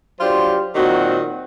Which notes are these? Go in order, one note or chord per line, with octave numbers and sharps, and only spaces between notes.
F#3 D4 F4 G4 C5
A#2 D#3 F#3 C4 F#4